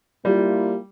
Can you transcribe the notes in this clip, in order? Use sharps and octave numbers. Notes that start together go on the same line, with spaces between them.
G3 A#3 E4 F4